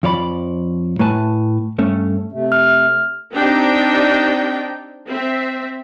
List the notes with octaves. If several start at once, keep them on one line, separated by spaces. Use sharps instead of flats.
F2 F3 C#5 D5 B5
A2 A3 B4 G#5 A5
G2 A3 C#4
C3 A3
F6
C4 D4 D#4 G4 G5
C4 E5